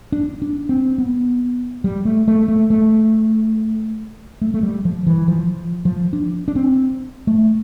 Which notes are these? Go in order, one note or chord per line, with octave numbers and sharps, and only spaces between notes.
D4
D4
C4
B3
G3
A3
A3
A3
A3
A3
A3
G3
F3
E3
F3
F3
D4
D4
C4
A3